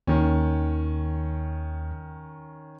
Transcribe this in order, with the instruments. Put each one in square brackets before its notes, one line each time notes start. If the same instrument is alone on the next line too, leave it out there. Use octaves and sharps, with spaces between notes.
[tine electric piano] D#2 [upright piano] D#3 C#4